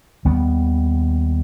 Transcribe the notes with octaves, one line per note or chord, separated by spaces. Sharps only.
D#2 D#3 G3 B3